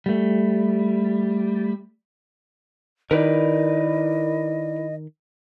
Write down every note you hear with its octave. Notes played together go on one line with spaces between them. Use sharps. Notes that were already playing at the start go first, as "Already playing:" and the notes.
G3 A3
D#3 E4 A#4 B4 D5 D#5